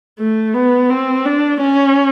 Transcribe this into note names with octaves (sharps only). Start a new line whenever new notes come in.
A3
B3
C4
D4
C#4